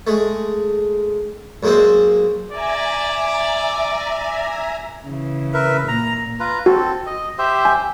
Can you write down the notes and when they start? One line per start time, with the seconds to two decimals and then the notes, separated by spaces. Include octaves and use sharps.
0.07 G#3 A3
1.63 F#2 G#3 A#3 C4
2.51 D5 E5 G#5 A#5
5.05 C#3 E3
5.54 A#4 B4 E5
5.88 A#2 A#5
6.40 F4 B4 A#5
6.66 C4 F#4 A4
7.06 D#5
7.38 G4 C5 E5
7.65 G#5